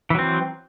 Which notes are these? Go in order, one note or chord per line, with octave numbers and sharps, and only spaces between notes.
E3 F#3 C4